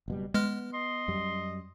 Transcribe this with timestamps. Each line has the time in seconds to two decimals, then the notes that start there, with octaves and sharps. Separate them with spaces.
0.08 F#1 B2 G3
0.34 G#3 B3 F6
0.74 D#5 C6
1.08 F#2 G3